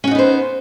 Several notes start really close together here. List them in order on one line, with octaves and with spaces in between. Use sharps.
C#4 F#4 D#4 B3 C5